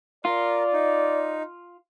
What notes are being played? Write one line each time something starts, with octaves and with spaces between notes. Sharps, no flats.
F4 A#4 D5
D#4